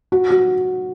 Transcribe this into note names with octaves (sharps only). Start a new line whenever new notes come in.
F#4
F#4